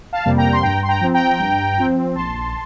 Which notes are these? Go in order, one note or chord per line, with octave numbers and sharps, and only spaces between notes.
F5 A5
F2 C3 G3 A#3
G5 A#5
C6
G2 G5 A#5
C6
G5 A#5
F3 C4
G5 A#5
G2
F3 C4
A#1 A5 C6